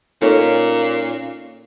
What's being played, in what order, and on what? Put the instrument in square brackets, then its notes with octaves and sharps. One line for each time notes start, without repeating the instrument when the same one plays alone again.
[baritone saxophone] A#2 [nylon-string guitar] C#4 D#4 C#5 [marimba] A4